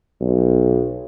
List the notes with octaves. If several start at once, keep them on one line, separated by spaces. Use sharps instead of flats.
B1